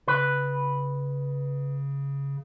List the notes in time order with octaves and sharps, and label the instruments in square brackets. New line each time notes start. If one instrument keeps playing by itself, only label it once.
[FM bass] C#3 [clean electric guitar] B4